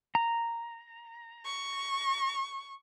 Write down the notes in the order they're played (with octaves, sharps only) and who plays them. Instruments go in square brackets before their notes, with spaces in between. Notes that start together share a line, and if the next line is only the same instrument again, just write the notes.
[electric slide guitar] A#5
[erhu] C#6